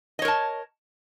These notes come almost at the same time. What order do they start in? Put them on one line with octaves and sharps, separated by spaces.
D#5 C#5 A#4 A5